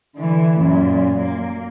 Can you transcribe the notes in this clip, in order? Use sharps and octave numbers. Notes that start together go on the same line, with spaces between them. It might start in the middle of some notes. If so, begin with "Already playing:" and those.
D3 E3
F#2 A#2
A#3